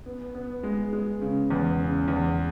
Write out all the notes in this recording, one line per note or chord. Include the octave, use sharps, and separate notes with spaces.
B3
B3
G#3
G#3
C#3
E2
C#3
E2